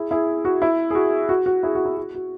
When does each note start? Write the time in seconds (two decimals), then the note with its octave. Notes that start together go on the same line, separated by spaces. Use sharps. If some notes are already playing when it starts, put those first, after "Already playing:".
Already playing: E4 G#4
0.11 E4 G#4
0.45 F#4
0.62 E4
0.91 G#4
0.95 F#4
1.29 F#4
1.46 F#4
1.63 E4 G#4
1.75 F#4
1.85 E4
1.97 F#4
2.15 F#4